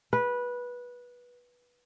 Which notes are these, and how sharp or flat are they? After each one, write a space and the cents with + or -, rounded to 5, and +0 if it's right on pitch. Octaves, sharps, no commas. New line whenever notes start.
B4 -15